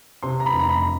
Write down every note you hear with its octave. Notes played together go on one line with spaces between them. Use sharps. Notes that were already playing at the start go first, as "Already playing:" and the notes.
C3 C6
A#5
B5
F1
A#5
B5